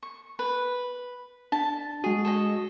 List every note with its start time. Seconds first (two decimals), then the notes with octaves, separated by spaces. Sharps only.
0.03 C#6
0.39 B4
1.52 D4 A5
2.04 G#3 F#4 G#4
2.25 A4 C#5 D#5